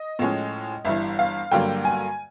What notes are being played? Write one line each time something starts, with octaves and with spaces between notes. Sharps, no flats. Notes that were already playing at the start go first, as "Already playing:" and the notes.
Already playing: D#5
A2 F3 G#3 C#4
G1 G2 E3 E5
F5
G2 D3 F#3 A#3 G5
G#5